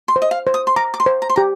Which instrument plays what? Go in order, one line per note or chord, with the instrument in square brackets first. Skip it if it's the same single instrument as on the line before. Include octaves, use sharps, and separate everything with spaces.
[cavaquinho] C6
[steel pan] C5
[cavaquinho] D#5
F5
[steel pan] C5
[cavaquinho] D#6
C6
[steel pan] A#5 [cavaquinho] D6
[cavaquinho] D6
C6
[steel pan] C5
[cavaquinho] A#5
C6
[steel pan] G4 [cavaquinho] A#5